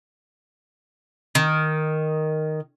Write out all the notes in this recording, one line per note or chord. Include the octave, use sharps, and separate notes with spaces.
D#3